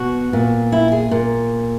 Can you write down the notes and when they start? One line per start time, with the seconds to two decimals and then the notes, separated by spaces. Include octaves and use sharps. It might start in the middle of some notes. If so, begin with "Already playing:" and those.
Already playing: B2 F#4
0.33 A#2
0.72 E4
0.92 G#4
1.11 A#2